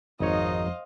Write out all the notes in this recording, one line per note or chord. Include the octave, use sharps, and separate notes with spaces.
G#1 F2 F3 D#4 C5 C#5 D#5 F5